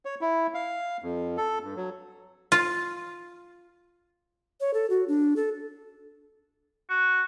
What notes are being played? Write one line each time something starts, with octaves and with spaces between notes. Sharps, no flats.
C#5
E4
F5
F2
A4
G2
F#3
F4
C#5
A4
F#4
D4
A4
F#4